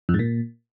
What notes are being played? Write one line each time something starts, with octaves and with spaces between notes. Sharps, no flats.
F2
G#2
A#2